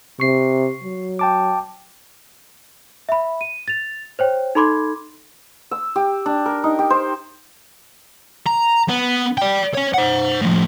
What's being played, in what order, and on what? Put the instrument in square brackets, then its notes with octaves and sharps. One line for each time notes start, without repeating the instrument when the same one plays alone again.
[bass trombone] C3 [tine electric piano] C#6 C7
[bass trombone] F#3
[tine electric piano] G5 A5 D6
[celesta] E5 B5
D#7
A6 F7
C5 C#5 G5
D#4 A4 B5 C6 D6 G#6
[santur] E6
G4
D4
A#4
D#4
G4
C5
[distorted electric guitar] A#5
B3
D5 G5
C#5 G#5
C5 F#5
A2 F3